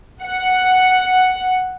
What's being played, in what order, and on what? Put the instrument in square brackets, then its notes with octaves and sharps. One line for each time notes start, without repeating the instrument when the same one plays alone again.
[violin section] F#5